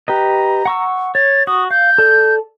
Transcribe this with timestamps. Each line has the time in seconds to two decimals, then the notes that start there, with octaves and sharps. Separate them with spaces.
0.08 G4 B4 D#5 A#5
0.65 F#5 C#6 E6
1.15 C#5 A6
1.47 F#4 D#6
1.71 F5 G6
1.98 A4 D5